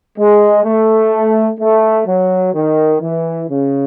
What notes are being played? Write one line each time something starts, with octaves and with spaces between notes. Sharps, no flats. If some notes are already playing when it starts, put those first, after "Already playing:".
G#3
A3
A3
F#3
D#3
E3
C#3